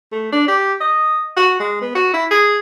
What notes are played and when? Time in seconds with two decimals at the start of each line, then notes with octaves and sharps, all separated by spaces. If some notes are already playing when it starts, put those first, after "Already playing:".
0.12 A3
0.32 D4
0.48 G4
0.81 D#5
1.37 F#4
1.60 G#3
1.82 B3
1.95 F#4
2.13 E4
2.31 G#4